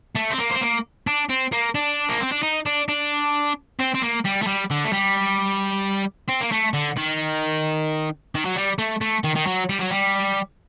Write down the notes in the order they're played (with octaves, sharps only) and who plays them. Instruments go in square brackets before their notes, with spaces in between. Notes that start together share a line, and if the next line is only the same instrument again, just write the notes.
[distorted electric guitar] A3
C4
A#3
C4
A#3
D4
C4
A#3
D4
A#3
C4
D4
D#4
D4
D4
C4
C4
A#3
G3
A3
G3
D3
A3
G3
C4
A#3
A3
D3
D#3
D#3
F#3
G3
A3
A3
D#3
D#3
F#3
G3
F#3
G3